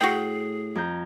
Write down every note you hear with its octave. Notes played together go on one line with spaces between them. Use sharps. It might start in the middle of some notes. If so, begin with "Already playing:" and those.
A2 F#4 G#4 G5
F2 A#5 G6